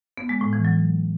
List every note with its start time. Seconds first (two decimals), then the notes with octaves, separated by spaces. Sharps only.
0.17 B3
0.29 G#3
0.41 A2
0.53 E3
0.65 F#3